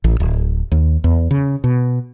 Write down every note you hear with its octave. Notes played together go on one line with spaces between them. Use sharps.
A1
D1
D#2
E2
C#3
B2